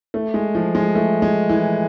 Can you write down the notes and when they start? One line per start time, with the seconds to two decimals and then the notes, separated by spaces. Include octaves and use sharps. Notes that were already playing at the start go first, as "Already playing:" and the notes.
0.14 A3
0.34 G#3
0.55 F3
0.75 G#3
0.95 A3
1.22 G#3
1.49 E3